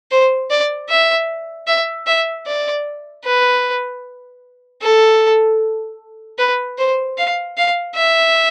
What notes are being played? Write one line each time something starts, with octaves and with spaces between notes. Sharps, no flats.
C5
D5
E5
E5
E5
D5
B4
A4
B4
C5
F5
F5
E5